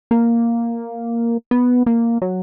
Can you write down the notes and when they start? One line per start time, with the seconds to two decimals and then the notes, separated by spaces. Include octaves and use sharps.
0.11 A#3
1.51 B3
1.86 A#3
2.22 F#3